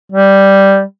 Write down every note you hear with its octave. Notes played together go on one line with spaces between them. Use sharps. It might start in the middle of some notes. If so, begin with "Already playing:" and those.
G3